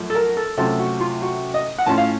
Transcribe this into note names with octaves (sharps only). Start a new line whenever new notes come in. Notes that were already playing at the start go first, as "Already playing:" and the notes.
Already playing: F#2 F3 A3
A4
A#4
A4
C3 F#3 A3 C#4 F4 A4
F#4
F4
F#4
D#5
F#5
A2 A3 C#4 F4 A5
F5